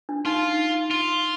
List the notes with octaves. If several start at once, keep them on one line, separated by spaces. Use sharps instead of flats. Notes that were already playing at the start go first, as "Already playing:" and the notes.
D4
D#4 F4
F4